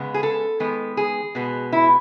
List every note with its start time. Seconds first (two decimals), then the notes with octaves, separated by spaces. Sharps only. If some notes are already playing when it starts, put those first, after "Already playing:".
Already playing: C#3 G#3 B3
0.14 G#4
0.23 A4
0.60 D#3 G#3 B3
0.97 G#4
1.35 B2 G#3 B3
1.72 E4